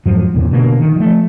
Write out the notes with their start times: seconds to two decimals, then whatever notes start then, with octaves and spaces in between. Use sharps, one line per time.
0.05 F2 G#2 F3 F#3
0.34 E2 A#2 C#3
0.51 B2 D3 E3 A#3
0.80 D#3
0.96 F3 A3